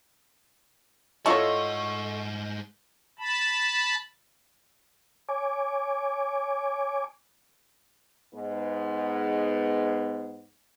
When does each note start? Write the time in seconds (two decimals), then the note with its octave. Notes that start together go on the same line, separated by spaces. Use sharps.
1.26 G#2 A3 E4 F4 A4 C#5 D#5 F#5
3.19 A5 B5
5.29 C#5 G#5 D6
8.33 G#2 B3